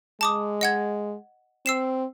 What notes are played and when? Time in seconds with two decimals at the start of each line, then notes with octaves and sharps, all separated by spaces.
0.21 G#3 A5 D6 D#6
0.61 D#5 F#5 G#6
1.66 C4 E6 C7 E7